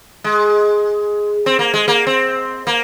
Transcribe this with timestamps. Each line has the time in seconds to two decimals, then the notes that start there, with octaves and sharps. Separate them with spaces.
0.24 G#3
1.46 C4
1.59 A#3
1.74 G#3
1.88 A#3
2.07 C4
2.67 A#3